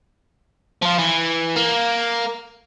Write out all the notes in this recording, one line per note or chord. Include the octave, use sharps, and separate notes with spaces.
F3 F4
E3
A#3